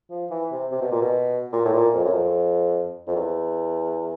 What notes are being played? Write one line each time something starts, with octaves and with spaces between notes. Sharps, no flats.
F3
E3
C3
C3
B2
A#2
B2
A#2
A2
A#2
F2
F#2
F2
F2
E2